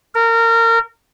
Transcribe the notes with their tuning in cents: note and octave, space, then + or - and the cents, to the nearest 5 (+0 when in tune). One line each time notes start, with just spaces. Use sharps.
A#4 -25